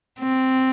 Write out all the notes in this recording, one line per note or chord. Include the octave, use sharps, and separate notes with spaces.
C4